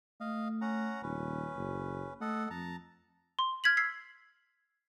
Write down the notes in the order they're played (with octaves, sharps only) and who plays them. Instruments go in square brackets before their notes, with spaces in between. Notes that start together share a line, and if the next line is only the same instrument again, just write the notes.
[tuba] A3 [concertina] D#5 F5
[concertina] C#4 F#5 A#5
[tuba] D#1 [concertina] C#4 B4
[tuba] F#1
[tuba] A3 [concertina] A4 D#5 F#5
[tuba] F2 [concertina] A5 A#5
[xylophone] C6
F6 G#6 B6 F#7
E6 G#6 B6 C7